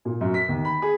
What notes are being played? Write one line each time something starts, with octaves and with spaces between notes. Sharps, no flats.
A#2
F#2
B6
D#2
B5
G#4